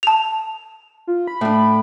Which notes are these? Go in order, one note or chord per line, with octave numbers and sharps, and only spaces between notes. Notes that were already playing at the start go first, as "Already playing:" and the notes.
A5 F7
F4
B5
A2 D4